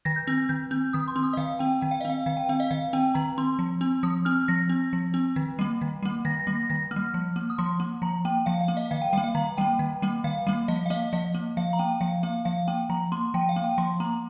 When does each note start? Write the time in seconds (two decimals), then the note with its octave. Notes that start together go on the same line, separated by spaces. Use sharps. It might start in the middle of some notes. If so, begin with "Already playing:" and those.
0.05 D#3 A#6
0.16 G6
0.27 C4 A#6
0.49 D#3 G6
0.71 C4 G6
0.93 D#3 D#6
1.08 C6
1.16 C4
1.23 D#6
1.33 D#5
1.37 D#3 F5
1.59 C4 G5
1.82 D#3 G5
1.91 F5
2.01 D#5
2.05 C4 F5
2.26 D#3 F5
2.37 G5
2.49 C4 F5
2.60 D#5
2.70 D#3 F5
2.93 C4 G5
3.15 D#3 A#5
3.38 C4 C6
3.59 F3
3.81 C4
4.03 F3 D#6
4.25 C4 F6
4.48 F3 A#6
4.69 C4
4.93 F3
5.14 C4
5.36 D#3
5.59 G3 A#3
5.81 D#3
6.03 G3 A#3
6.25 D#3 A#6
6.40 A#6
6.47 G3 A#3
6.55 A#6
6.70 D#3 A#6
6.91 A#3 F6
6.96 G3
7.14 F3
7.36 A#3
7.50 D#6
7.58 F3 C6
7.80 A#3
8.02 F3 A#5
8.25 A#3 G5
8.46 F3 F5
8.61 F5
8.68 A#3
8.77 D#5
8.91 D#3 F5
9.02 G5
9.13 G3 F5
9.18 A#3
9.24 F5
9.35 D#3 A#5
9.57 G3 A#3 G5
9.79 D#3
10.02 G3 A#3
10.24 D#3 F5
10.47 G3 A#3
10.68 F3 D#5
10.86 F5
10.90 A#3 D#5
11.13 F3 D#5
11.34 A#3
11.57 F3 F5
11.73 A#5
11.79 A#3 G5
12.01 F3 F5
12.23 A#3 F5
12.45 F3 F5
12.68 A#3 G5
12.89 F3 A#5
13.12 A#3 C6
13.34 F3 G5
13.49 F5
13.56 A#3
13.64 G5
13.78 F3 C6
14.00 A#3 A#5